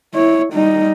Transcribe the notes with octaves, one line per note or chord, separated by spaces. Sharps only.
E4 C#5
G3 D#4